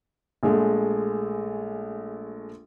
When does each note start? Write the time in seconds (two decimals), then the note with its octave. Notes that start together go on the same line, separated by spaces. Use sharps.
0.43 A#1 G#3 A3